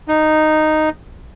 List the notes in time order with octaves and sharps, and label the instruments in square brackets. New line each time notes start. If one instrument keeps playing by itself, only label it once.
[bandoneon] D#4